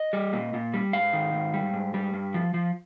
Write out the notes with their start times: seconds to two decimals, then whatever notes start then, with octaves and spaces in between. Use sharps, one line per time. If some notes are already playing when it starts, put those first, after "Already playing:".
Already playing: D#5
0.13 G3
0.33 A#2
0.54 A#2
0.74 G3
0.93 G#2 F5
1.13 D#3
1.34 G#2
1.54 G3
1.73 G#2
1.94 G3
2.14 G2
2.34 F3
2.54 F3